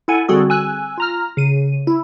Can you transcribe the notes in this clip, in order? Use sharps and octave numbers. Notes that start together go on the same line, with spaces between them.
E4 A4 F#5 G#5
D3 G3 C4 F#4 G#4 A4
G#5 E6 F#6
F4 A#5 F6
C#3 D#7
E4